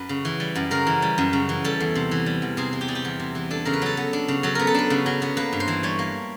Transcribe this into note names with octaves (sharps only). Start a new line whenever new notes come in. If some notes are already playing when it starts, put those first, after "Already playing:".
Already playing: F#2 B4
C#3
E3
G3
F#2
C#3 A#4
E3
G3
F#2
C#3
E3
G3 A4
E2
C3
E3
G3
E2
C3 G#4
E3
G4
G3 G#4
G4
E2
C3
E3
D4 A4
C#3 A#4
B4
F#3 A4
B3
D4
C#3
F#3 A4
B3 A#4
A4
D4 B4
C#3
F#3
B3
A#3 B4
G2
C5
E3
G3 C#5
A#3